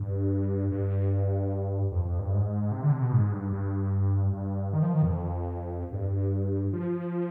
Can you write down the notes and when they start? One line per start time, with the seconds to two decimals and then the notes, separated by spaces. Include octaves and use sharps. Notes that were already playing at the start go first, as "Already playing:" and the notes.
Already playing: G2
0.72 G2
1.92 F2
2.05 F2
2.19 G2
2.33 G#2
2.72 C3
2.83 D3
2.92 C3
3.02 B2
3.12 G#2
3.32 G2
3.53 G2
4.33 G2
4.73 D#3
4.83 F3
4.93 D#3
5.03 F2
5.92 G2
6.73 F3